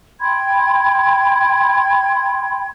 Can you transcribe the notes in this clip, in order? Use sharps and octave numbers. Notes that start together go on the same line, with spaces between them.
G5 B5 C6 G#6